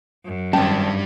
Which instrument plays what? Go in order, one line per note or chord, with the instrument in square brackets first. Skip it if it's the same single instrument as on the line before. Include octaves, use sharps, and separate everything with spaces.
[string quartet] F#2
[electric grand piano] G#1 A5 [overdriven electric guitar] G2 G3 [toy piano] C#4